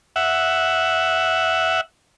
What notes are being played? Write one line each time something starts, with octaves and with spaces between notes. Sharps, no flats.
E5 F#5